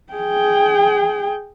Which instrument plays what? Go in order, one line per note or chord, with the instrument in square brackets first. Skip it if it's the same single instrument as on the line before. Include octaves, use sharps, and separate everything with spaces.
[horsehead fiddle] G#4 G5